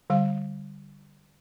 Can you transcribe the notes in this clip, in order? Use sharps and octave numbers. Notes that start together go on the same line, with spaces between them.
D3 G3 F5